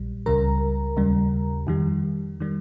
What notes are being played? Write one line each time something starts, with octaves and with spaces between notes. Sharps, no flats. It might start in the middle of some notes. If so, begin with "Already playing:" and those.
Already playing: A#1 A#2 G3
C#2 C#3 G3 A#4 A#5
D#2 C#3 G3
F2 D#3 G3
D#3 G3